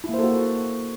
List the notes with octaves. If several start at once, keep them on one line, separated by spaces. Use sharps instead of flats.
A#3 E4 F#4 A4 C5